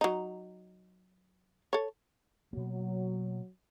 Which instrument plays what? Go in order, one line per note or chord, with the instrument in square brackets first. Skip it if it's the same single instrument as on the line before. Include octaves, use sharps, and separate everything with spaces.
[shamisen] F#3 D#4
A4 C#5
[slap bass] B2 A#3 [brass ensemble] F#3